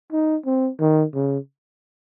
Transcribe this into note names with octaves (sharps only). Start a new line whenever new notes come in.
D#4
C4
D#3
C#3